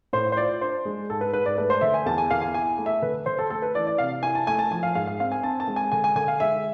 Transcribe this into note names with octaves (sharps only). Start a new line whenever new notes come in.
A2 C5
C5
F4 D5
D4 C5
G#3
G#2 A4
B4
G#2 B4
D5
A3 B4
C5
D3 E5
G#5
E2 A5
G#5
E2 F5
G#5
E4 G#5
A3
E5
D3 B4
D3 C5
A4
A3 A4
B4
E3 D5
D5
C3 F5
E4 G#5
A5
A3 G#5
A5
F3 G#5
F5
G#2 F5
F5
C4 F5
G#5
C4 A5
A5
G#3
G#5
D3 G#5
G#5
D3 G#5
F5
G#3 E5